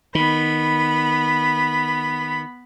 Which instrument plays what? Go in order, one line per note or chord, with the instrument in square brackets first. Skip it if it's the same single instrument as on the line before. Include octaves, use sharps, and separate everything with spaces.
[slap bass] D#3 [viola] B3 B5